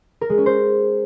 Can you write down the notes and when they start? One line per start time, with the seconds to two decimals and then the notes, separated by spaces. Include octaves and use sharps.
0.21 A#4
0.30 G#3
0.38 C#4
0.46 C5